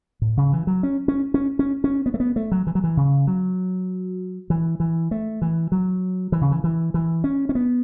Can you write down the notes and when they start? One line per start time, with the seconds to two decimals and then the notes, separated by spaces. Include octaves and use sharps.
0.22 A2
0.37 C#3
0.53 E3
0.67 F#3
0.83 C#4
1.08 C#4
1.34 C#4
1.59 C#4
1.84 C#4
2.06 B3
2.14 A3
2.20 B3
2.36 A3
2.52 F#3
2.67 E3
2.75 F#3
2.84 E3
2.97 C#3
3.27 F#3
4.50 E3
4.80 E3
5.11 A3
5.42 E3
5.72 F#3
6.32 E3
6.41 C#3
6.52 E3
6.64 E3
6.94 E3
7.24 C#4
7.49 C#4
7.55 B3